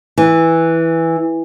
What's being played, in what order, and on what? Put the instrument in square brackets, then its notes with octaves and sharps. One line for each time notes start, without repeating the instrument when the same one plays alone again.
[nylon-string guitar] E3